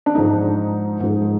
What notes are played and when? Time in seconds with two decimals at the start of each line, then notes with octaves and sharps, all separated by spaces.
0.06 D4
0.15 G#2 F3 G#3 D#4
1.00 G#2 F3 G#3